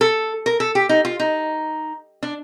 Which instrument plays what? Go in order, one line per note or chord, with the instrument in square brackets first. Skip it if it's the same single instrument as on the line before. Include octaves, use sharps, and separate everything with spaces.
[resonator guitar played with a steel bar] A4
A#4
A4
G4
D#4
F4
D#4
D4